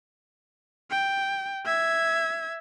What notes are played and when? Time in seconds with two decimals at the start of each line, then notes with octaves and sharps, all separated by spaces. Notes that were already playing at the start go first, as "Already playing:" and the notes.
0.90 G5
1.66 E5 G#6